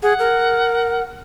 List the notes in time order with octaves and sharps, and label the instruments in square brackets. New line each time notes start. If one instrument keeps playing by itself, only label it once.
[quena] G#4 [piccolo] F#5
[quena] A#4